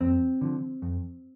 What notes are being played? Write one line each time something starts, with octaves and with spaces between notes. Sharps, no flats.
F2 C4
D3 F3
F2